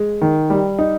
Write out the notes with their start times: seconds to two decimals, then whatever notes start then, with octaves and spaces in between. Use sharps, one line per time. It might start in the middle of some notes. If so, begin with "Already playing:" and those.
Already playing: G#3
0.22 D#3
0.50 G3
0.79 D#4